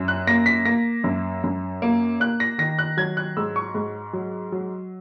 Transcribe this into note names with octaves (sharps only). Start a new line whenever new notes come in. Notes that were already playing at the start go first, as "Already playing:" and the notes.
Already playing: F#2
F#6
A#3 A#6
B6
A#3 A#6
F#2
F#2
A#3
A#3 F#6
A#6
D#3 A#6
F#6
F#3 G#6
F#6
G#2 E6
C#6
G#2
F#3
F#3